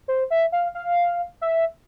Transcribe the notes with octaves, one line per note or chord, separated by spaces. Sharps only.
C5
E5
F5
F5
E5